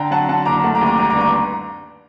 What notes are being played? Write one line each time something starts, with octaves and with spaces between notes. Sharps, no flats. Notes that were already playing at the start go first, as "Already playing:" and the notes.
Already playing: D3 G5 A#5
F#3 F#5 A5
D3 F#5 A5
F#1 A#5 D6
A3 F#5 A5
A#5 D6
D#2
A#5 D6
G1 A#5 D6
A#5 D6
G2
A#5 D6